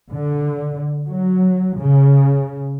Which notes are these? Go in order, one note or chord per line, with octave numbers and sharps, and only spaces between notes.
D3
F#3
C#3